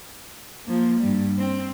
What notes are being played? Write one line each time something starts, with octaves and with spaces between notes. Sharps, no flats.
F3 A#3
G2 G3
C4